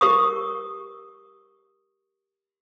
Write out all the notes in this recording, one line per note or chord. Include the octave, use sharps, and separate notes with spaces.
G4 A#4 C#6 D#6